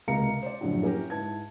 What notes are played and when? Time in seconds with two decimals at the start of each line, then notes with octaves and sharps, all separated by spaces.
0.08 C#2 C3 A#3 F5 A#5 C#7
0.42 C5 D5
0.61 F#2 A2 D3 F3 F#3
0.83 A#3 C#4 E4 G4 A#4
1.10 G#2 E4 B4 A5 G#6